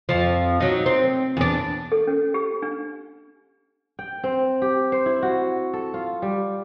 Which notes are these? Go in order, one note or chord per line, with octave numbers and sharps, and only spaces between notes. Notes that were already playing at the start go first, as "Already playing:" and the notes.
F2 F3
F#3 D#4
C4
E2 D4
A4
C#4
G4
D4
G5
C4
G4
C5
E4
F#4
A4
F4
G3